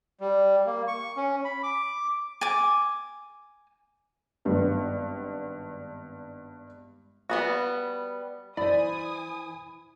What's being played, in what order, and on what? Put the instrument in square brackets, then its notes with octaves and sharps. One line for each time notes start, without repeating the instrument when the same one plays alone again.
[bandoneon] G3
A#3
C#6
C#4
B5
D6
[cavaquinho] G#5 D6
[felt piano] G#1 G2 B3
[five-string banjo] G3 B3 F#4
[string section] E3 G#5 D#6 [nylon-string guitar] E4 C5 [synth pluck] D5 [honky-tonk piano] B5